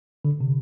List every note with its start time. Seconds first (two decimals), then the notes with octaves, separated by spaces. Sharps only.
0.25 D3
0.40 C3